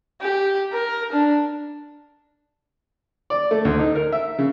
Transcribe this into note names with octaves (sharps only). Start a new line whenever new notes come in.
G4
A#4
D4
D5
A3
D2
D#4
A#4
E5
C#3